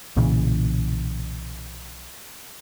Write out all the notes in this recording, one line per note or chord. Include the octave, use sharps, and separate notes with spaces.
B1 A#2 C#3 E3